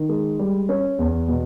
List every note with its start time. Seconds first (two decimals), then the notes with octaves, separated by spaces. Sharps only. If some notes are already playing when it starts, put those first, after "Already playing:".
Already playing: D#3
0.09 G#3
0.39 G3
0.69 C#4
0.99 E2
1.28 B2